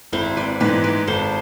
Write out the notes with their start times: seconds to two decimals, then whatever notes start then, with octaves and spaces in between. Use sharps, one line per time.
0.13 G#1 C4 E4
0.37 B4 D5
0.60 G#2 E3 B4 D5
0.84 B4 D5
1.07 G#1 A4 C5